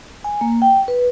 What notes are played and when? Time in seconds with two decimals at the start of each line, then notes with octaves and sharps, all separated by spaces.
0.24 G#5
0.41 A#3
0.62 G5
0.88 B4